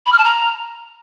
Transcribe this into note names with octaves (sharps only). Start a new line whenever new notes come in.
B5
F6
A5
A#5